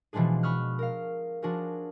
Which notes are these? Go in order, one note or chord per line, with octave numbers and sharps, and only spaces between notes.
B2 E3 F3 G#3 D4 G#4
B5 C#6 D#6 F6 F#6
A#4 F5
F3 D4 F#4 G#4 A#4